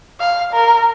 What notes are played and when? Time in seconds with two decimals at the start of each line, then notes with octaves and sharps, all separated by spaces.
0.20 F5
0.53 A#4